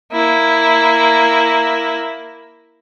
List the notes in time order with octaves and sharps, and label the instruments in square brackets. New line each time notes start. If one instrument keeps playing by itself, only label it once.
[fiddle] A#3 E4